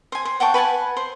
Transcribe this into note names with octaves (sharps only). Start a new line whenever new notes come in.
C5 G#5
C5
F#5 G5 A5 C#6
B4 F#5 G#5 A5
C5